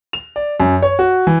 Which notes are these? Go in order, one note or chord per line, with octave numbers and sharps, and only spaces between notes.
F7
D5
F#2
C#5
F#4
E3